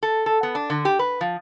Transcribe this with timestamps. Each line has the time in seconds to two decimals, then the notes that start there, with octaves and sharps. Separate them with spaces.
0.03 A4
0.26 A4
0.43 B3
0.55 D4
0.70 D3
0.85 G4
0.99 B4
1.21 F3